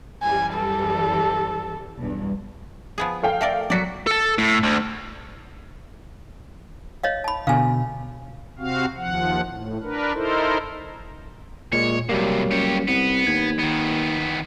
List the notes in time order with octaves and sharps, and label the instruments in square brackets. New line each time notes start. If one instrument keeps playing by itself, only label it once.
[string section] F#2 E3 G3 [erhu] G#5
[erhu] A4
[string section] B1 E2 G2
[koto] F3 B3 G#4
[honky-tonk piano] A4 F5 G5
[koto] A3 A#4 D5
[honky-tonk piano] F#3 B6 C#7 [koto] F#4 D5
[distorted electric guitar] A4 A5
A2
D2
[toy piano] C#5 D#5 F5
A5 B5
[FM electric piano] B2 D3 [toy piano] F5 G#5
[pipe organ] C3 C4 F#4 F5
D#2 F3 F#5
A2
D4 A#4 B4
D#4 E4 A4 A#4 C5
[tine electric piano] A#2 G#3 [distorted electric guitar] C#5
[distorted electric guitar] A2 C3 [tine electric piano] F#3 G3 A#3
[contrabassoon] C#2 [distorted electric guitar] G4 C#5
[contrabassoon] C2 [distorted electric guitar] B3
[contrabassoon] D#2 [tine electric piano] G#6
[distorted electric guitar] D#3 B3